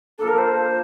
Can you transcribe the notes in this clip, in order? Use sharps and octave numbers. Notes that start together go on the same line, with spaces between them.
F3 A#3 D4 A4
A#4
C5